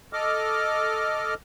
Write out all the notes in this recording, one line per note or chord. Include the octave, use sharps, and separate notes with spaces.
A4 D#5 D6 F6